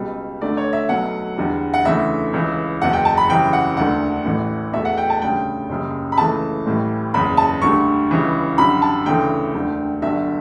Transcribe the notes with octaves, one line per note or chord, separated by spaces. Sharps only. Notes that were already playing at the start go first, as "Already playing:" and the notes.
Already playing: C#2 B2 G3
D2 D3 A3 D5
C#5
E5
B1 B2 F#3 A3 F#5
E2 D3 G3
F#5
D2 C#3 E3 A3 E5
C#2 C#3 E3
F#1 E2 B2 F#5
G5
A5
B5
F#2 C#3 E3 G3 G5
F#5
E1 D2 D3 F#5
A1 A2 E3
E2 B2 A3 E5
F#5
G5
A5
D2 C#3 G3 G5
F#1 F#2 C#3 G3
B5
C#2 C#3 E3 A3 A5
A1 A2 E3 G3
F#1 E2 C#3 B5
A5
D2 D3 G3 C#6
C#2 C#3 E3 G3
F#2 D3 G3 B5
A5
D2 C#3 E3 A3 G5
E1 D2 D3
G1 G2 D3 F#3 E5